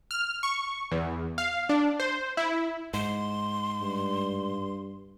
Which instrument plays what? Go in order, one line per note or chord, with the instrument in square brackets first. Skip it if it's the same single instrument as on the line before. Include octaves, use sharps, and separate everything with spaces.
[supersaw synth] F6
C#6
E2
F5
D4
C5
E4
[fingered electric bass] G#2 [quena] C6
[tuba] G2